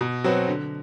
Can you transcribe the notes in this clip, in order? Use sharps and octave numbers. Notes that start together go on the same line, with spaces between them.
B2
F#3 C4 F#4 B4
D3